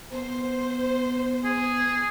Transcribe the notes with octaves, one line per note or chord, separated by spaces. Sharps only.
B3 C5
G#4